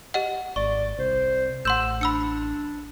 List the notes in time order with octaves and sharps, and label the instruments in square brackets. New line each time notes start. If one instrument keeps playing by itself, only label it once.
[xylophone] G4 D#5 F#5
[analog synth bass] G#1 [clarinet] D5 [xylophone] C#6
[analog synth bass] C2 [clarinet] C5
[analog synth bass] A1 [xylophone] F#5 C6 G6 [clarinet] E6
[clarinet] D4 [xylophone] B5 E6 C#7